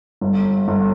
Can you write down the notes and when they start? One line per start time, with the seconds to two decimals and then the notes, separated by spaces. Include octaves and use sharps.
0.21 G1
0.68 G1